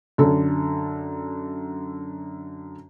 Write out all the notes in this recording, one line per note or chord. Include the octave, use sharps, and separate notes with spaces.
F#2 D3 A4